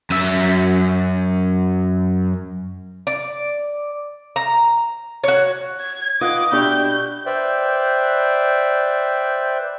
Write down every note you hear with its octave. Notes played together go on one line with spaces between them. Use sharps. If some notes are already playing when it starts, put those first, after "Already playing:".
F#2 E5
D5
A#5
F#4 C#5
G#6
D#4 F4 B4 D#5 F#5 G#5 D6
B2 D4 G4 B4 E5 C#6 G6
B4 C5 D5 E5 G5